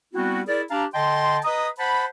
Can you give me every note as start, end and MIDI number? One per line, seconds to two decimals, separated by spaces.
0.14 0.41 55
0.14 0.41 59
0.14 0.41 60
0.14 0.41 64
0.14 0.41 66
0.47 0.61 64
0.47 0.61 68
0.47 0.61 70
0.47 0.61 74
0.70 0.84 62
0.70 0.84 67
0.70 0.84 77
0.70 0.84 81
0.70 0.84 82
0.94 1.38 50
0.94 1.38 75
0.94 1.38 79
0.94 1.38 81
0.94 1.38 84
1.44 1.68 71
1.44 1.68 75
1.44 1.68 82
1.44 1.68 87
1.78 2.04 72
1.78 2.04 78
1.78 2.04 81
1.78 2.04 83